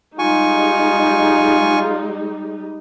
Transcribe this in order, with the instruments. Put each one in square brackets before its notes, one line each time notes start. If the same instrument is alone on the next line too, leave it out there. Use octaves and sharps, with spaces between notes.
[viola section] G3 G#3 D#4 [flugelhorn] F4 [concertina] G#5 C#6